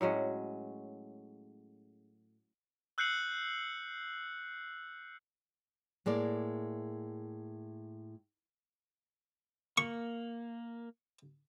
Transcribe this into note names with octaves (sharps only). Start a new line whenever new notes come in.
A2 F#3 G#3 C#4
E6 F#6 G6 C7 C#7 F#7
A2 G#3 A#3 D5
A#3 C#6